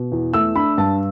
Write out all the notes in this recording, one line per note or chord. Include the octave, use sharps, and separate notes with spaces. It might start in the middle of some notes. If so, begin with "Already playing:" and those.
Already playing: B2
E2
A3 E6
D4 B5
G2 A5